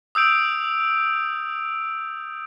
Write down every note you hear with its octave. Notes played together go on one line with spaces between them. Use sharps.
D#6 E6 G6 D7 F7